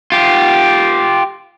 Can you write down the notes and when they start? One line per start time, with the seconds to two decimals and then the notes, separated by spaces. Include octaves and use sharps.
0.12 F4 G4